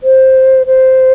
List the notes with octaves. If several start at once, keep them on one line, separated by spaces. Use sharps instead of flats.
C5
C5